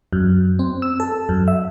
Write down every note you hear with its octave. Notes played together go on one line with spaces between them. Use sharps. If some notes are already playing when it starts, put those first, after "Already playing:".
F#2
C4
E6
A4
F#2
E5